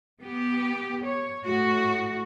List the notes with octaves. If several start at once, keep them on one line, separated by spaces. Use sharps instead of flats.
B3 G4
C#5
A2 F#4